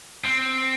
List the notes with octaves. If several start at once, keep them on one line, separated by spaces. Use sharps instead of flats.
C4